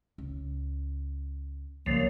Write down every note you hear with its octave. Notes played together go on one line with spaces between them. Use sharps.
C#2
C2 C#3 F3 G3 A#3